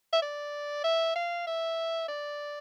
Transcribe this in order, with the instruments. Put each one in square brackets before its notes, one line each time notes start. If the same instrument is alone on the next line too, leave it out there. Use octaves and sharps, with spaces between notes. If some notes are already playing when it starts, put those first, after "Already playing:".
[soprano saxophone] E5
D5
E5
F5
E5
D5